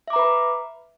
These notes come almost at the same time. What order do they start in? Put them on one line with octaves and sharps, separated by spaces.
E5 D6 A#5 B4 B5